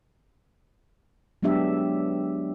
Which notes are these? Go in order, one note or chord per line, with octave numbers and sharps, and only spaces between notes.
F#3 G#3 B3 D4 G4 E5